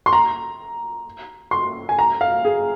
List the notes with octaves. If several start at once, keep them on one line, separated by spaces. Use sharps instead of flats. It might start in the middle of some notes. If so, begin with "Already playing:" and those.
C6
A#5
C6
G#5
A#5
F5
G#4